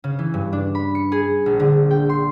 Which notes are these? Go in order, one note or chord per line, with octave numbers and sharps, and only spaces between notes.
C#3
E3
G2
D4
B5
C#7
G#4
A#1
D3
G5
C6